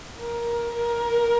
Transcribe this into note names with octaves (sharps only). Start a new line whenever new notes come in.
A#4
A#4